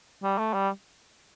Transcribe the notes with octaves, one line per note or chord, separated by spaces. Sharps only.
G3
A3
G3